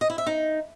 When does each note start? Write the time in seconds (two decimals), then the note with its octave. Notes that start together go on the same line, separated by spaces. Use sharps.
0.01 D#5
0.10 E4
0.18 E5
0.26 D#4